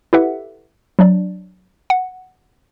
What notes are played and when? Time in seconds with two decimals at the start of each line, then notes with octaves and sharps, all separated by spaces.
0.13 E4 G4 A4 B4 E5 F#5
0.99 F#3 D4 D5
1.90 F#5